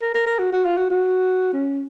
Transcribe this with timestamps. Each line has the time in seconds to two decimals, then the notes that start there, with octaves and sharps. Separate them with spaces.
0.01 A#4
0.14 A#4
0.26 A#4
0.39 F#4
0.53 F#4
0.65 F4
0.77 F#4
0.90 F#4
1.53 C#4